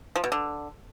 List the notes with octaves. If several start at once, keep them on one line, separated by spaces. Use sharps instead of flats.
F3
B2
D3